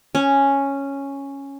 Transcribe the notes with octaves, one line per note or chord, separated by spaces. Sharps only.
C#4